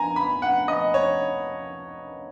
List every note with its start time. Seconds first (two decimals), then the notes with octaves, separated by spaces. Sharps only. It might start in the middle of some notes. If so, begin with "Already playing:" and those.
Already playing: G#5 A#5
0.16 B5
0.42 F#5
0.68 D#5
0.94 C#5